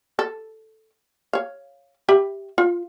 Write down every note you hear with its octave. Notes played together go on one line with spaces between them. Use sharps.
A4
C#5 F5
G4 E5 B5
F4